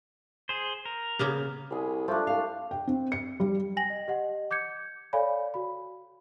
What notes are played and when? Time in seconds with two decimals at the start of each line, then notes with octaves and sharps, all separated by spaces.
0.49 G#4 C5
0.85 A#4
1.19 C#3 A#3 B3
1.70 C2 G#4 B5
2.08 F3 G3 A3 D4
2.27 C2 F5
2.71 G5
2.87 C4
3.12 C#7
3.40 G3
3.77 G5 G#5 A#6 F#7
3.90 D#5
4.08 G4 D#5 F#5
4.51 D6 G6 G#6 C#7
5.13 A4 C#5 D5 F5 G#5 B5
5.54 F#4 B5